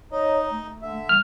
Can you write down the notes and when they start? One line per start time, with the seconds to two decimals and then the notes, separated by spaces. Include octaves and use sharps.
0.12 D#4 C#5 D#5
0.50 A3
0.82 D3 E5
1.09 G3 F6